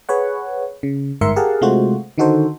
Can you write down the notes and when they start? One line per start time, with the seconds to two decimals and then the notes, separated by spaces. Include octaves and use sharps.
0.09 G#4 B4 C#5 F#5
0.83 C#3
1.21 G1 G#2 A#4 E5 C6 C#7
1.36 G4 G#4 A#4 F5 F#5 A5
1.61 C3 G#3 A3 F4 F#4 C5
2.18 D3 D#3 D#4 F#4 A4 C5